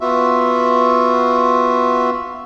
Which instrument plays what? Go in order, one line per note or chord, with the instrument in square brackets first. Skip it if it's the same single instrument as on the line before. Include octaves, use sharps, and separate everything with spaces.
[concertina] B3 F4 F#4 E5